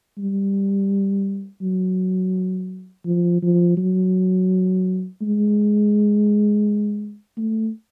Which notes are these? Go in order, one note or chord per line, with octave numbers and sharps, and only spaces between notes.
G3
F#3
F3
F3
F#3
G#3
A3